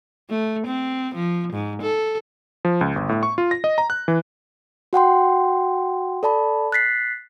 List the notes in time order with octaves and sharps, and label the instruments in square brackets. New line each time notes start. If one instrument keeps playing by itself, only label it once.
[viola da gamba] A3
C4
F3
G#2
A4
[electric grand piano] F3
C#2
G1
A2
C#6
F4
A#6
D#5
A#5
F#6
E3
[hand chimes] F#4 F#5 G5 C6
A4 D5 A5 B5
F#6 A6 B6 C7